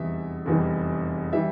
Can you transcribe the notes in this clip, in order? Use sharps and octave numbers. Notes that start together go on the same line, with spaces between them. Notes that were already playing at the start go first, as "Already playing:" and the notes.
Already playing: F1 E2 E3 G3 E5
F1 E2 E3 G3
E3 G3 E5